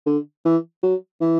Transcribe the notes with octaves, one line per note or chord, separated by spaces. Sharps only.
D3
E3
F#3
E3